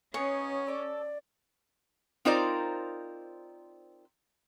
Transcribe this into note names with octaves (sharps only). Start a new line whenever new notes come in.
B3 C#4 D#4 G#4 C#5
A4 D5 D6
C4 D#4 F4 A#4 C5 D5